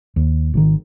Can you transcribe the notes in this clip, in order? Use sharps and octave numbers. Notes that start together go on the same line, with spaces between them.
D#2
G#1 C3 D#3